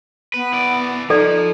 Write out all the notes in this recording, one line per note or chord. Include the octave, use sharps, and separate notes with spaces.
B3 B4
E4 D5
F3 D#4 A4 D5